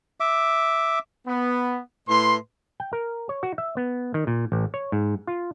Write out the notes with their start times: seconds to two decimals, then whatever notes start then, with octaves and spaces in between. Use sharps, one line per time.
0.20 E5 D6
1.27 B3
2.08 A2 B4 C6
2.80 G5
2.93 A#4
3.29 C#5
3.43 F#4
3.58 E5
3.77 B3
4.14 D#3
4.27 A#2
4.52 A1
4.74 C#5
4.92 G#2
5.27 F4